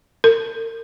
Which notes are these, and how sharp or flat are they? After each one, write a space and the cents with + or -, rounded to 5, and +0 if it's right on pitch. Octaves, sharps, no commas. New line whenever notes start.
A#4 -40